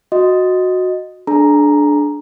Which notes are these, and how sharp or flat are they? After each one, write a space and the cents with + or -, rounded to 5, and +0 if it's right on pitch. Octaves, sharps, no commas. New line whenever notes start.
F#4 -10 D#5 +0
D4 +0 G#4 +45 A#5 +0